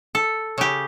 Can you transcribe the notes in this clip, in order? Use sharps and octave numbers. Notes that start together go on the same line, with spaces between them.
A4
C#3 G4